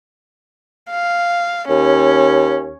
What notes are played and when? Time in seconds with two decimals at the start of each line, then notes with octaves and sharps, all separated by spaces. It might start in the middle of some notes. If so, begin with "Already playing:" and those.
0.91 F5
1.69 D#2 C#4